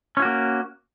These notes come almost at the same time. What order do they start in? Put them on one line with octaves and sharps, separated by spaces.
C#4 E4 F#4 A#3